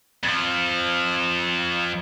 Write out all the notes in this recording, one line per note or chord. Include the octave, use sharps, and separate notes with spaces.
F2 F3